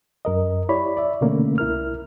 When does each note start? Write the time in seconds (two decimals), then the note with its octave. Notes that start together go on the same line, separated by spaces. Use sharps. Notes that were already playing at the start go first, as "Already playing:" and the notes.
0.25 F#2 A#4 D#5
0.69 E4 G4 C#5 D5 B5
0.97 D5 E5
1.21 B2 D3 E3 A3 A#3 C#4
1.58 C2 E4 A#4 F6